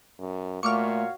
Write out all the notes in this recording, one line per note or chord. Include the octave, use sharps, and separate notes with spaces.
F#2
A#2 A3 F#4 C#5 F5 C#6 D6 F6